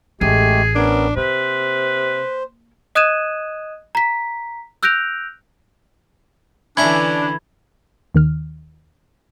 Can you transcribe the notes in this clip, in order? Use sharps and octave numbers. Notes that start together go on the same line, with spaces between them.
A1 G#3 A3 G4 G#4
B3 C#4 D4 A#4
C3 A#3 B4 C5
D#5 D#6 F#6 G#6 D#7 E7
A#5 B6
E6 F#6 G6 A#6 D7 F7
D3 E3 C#4 D4 E4 A#5 B5 G#6
D#2 D#3 F6